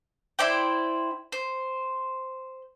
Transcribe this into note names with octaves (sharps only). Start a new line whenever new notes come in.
E4 C5 D5 G5
C5